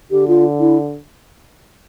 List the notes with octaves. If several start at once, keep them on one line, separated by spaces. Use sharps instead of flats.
D3 G4
F4
E4